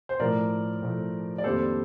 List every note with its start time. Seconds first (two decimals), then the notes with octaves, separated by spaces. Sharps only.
0.09 C5
0.19 A2 F3 A3 A#4 D5
0.82 A2 F3 A3
1.38 D5
1.44 F2 D#3 G3 A#3 D4 A4 C5